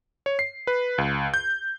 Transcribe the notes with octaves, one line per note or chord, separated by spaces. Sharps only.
C#5
C7
B4
C#2
G6